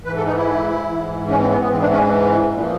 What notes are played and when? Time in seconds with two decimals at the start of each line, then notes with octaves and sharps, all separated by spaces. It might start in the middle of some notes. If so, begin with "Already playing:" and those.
0.04 G#2 E3 B4
0.16 A4
0.25 D#4
0.37 E4
0.88 G#2 E3
1.29 C#4
1.40 C4
1.50 B3
1.61 B3
1.70 G#2 E3 C4
1.80 D4
1.91 C#4
2.53 A#2 F3